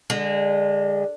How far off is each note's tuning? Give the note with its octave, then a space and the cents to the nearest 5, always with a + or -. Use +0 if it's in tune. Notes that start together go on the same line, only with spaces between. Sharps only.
D3 +0 G#3 -30